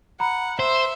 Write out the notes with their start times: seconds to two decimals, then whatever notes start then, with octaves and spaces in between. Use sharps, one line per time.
0.20 F#5 A#5 B5
0.60 C5 E5